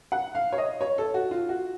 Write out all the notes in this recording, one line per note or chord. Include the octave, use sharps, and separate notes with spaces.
F#5
F5
C#5
D#5
C#5
A4
F#4
F4
F#4